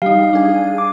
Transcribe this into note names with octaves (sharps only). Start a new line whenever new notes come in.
G3 D#4 F5
D4 G#4
D6